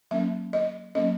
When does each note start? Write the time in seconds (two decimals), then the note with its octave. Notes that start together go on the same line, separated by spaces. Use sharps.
0.11 F#3 A#3 C#4 E5
0.53 D#5
0.95 F#3 A#3 C#4 D#5